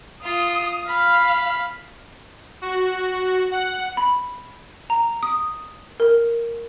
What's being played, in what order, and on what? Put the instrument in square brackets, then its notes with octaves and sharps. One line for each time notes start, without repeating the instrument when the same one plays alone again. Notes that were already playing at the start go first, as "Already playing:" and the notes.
[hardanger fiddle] F4 [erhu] D#6
[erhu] F5 [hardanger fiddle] B5
[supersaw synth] F#4
F#5
[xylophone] B5
A#5
D#6
A#4